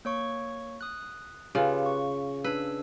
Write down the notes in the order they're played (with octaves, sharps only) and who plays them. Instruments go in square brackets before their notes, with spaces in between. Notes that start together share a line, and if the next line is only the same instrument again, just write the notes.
[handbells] A#3 C#5 C#6
D#6 F#6
[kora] C#3 F4 [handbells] G4 B4
[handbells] C#6
[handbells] D4 E6 [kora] B4